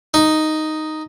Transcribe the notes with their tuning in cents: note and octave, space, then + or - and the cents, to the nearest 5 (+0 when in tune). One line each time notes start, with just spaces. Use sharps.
D#4 +0